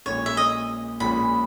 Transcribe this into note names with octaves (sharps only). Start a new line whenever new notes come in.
A#1 A#2 G#3 C#4 C#5
E5
D#5
A#1 A#2 G#3 C#4 B5